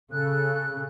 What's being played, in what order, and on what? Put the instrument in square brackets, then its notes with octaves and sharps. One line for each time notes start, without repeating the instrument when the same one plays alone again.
[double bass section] C#3 [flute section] A4 F#6